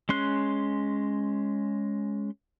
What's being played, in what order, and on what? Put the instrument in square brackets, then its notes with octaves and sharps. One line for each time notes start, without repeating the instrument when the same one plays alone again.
[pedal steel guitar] G#3 C#4 C6 F#6